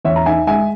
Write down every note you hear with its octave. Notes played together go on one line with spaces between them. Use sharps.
E2 C#5 E5
A#5
D#4 E5 G#5
G#3 E5 G#5